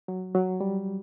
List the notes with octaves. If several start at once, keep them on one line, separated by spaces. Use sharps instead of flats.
F#3
F#3
G3